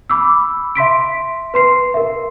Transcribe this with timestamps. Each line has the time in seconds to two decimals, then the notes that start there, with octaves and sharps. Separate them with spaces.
0.10 B5 D6 E6
0.75 E5 C6 B6 D7
1.54 B4 C6 C7
1.94 A#4 E5